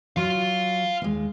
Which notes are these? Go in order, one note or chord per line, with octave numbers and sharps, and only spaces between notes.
F#3 F5 C6
D#2 G#3